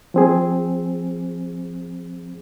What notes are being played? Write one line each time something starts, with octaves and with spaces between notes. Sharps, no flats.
F3 C4 G#4